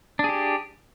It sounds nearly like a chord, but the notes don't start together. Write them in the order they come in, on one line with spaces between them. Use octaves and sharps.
D4 G#4 G4